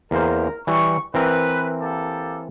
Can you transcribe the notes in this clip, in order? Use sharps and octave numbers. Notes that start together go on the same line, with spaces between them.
E2 A#3 A#4 C5
E3 G3 C#6
E3 C4 A#4 B4
A#3 G4 A4